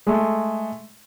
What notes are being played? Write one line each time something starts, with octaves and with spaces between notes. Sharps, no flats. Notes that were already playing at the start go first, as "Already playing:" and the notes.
G#3 A3